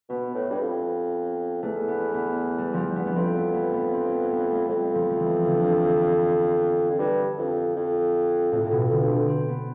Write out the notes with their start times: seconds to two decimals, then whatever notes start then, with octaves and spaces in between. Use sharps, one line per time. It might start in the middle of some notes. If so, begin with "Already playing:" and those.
0.09 B2 B3
0.35 A2
0.50 G2
0.60 F2
1.63 E2 A3
1.88 B3
2.14 B3
2.58 G3
2.74 F3 G3
2.96 B3
3.06 B3
3.16 F2 C4
3.35 B3
3.54 B3
3.73 B3
3.92 C4
4.12 B3
4.30 B3
4.49 A3
4.68 F2 G3
4.95 F3
5.10 F3
5.20 E3
5.46 D3
6.90 F2
6.99 G2
7.38 F2
7.76 F2
8.52 F2 A2
8.65 A2
8.71 B2
8.91 D3
9.09 C4
9.28 C4
9.49 B3